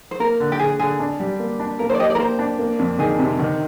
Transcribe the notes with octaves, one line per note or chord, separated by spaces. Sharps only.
C5
A#3 A#4
D3
G4
D3 G#4
D3 G#4
D4
G3
A#3
D4
A#3 A#4
C5
D5
G4 D#5
D5
A#4
A#3 C5
D4
A#3
F2
D#3 G#4
C3
D#3